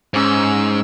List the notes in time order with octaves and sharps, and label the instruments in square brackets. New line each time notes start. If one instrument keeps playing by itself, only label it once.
[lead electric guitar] G#2 [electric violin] C#4 E6